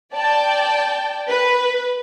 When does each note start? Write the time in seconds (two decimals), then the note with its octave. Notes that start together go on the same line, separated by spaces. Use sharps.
0.13 D5 G5 A5
1.28 B4